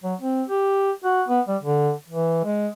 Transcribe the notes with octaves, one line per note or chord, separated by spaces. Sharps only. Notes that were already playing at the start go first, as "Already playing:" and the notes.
F#3
C4
G4
F#4
B3
G3
D3
E3
G#3